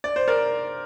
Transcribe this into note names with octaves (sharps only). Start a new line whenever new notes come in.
D5
C5
A#4 D5